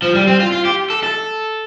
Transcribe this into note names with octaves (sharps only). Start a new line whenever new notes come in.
F3
G3
C4
F4
F4
G4
A4
A4